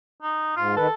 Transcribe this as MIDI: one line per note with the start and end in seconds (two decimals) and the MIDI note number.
0.22 0.55 63
0.57 0.76 44
0.57 0.75 65
0.76 0.87 51
0.76 0.94 69
0.76 0.87 71